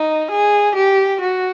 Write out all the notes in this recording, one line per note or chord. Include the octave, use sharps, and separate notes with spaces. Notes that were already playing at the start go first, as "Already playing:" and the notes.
Already playing: D#4
G#4
G4
F#4